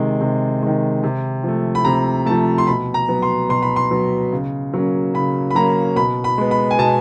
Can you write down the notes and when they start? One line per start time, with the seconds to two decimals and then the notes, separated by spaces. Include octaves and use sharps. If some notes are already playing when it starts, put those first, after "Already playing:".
Already playing: C3 D#3 G#3
0.21 C3
0.62 D#3 G#3
1.04 C3
1.43 F3 A3
1.75 B5
1.85 C3 A#5
2.26 F3 A3 A5
2.58 C6
2.67 B2 B5
2.94 A#5
3.08 F#3 B3
3.23 C6
3.49 B2 C6
3.63 B5
3.76 C6
3.91 F#3 B3
4.32 C#3
4.74 F#3 A#3 C#4
5.14 C#3 B5
5.51 B5
5.55 F#3 A#3 C#4 A#5
5.96 B2 B5
6.24 B5
6.38 G#3 B3
6.51 B5
6.71 G#5
6.79 B2 A5